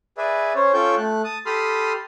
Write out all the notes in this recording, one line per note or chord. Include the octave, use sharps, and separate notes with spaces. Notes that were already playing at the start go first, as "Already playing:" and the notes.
G#4 B4 D5 E5
C#4 C5 C#5
C#4 F4 A4 G5 C#6 G6
A3 F#6
A5 D#6
G4 A4 B5 C6 D#6 F6